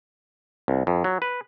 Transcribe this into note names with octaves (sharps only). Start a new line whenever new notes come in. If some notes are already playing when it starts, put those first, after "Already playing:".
C2
F2
F#3
B4